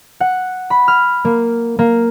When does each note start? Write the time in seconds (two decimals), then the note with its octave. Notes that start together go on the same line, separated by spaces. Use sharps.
0.20 F#5
0.70 B5
0.88 F6
1.25 A#3
1.79 A#3